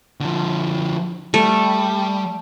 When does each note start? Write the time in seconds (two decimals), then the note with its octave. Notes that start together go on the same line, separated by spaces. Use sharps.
0.21 D3 F3
1.34 G3 A3